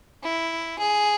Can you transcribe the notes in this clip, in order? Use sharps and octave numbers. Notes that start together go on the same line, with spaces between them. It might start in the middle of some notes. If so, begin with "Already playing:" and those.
E4
G#4